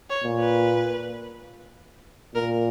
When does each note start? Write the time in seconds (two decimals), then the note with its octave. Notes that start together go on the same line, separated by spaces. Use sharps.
0.10 C#5
0.24 A#2
0.39 B4
2.34 A#2 A#4